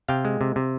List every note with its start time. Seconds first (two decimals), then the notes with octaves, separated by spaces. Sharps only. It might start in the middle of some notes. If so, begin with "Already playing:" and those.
0.08 C3 F5 G5
0.25 G#3
0.41 C3
0.56 C3